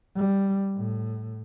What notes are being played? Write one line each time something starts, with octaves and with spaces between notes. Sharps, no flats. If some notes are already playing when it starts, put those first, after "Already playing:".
G3
A2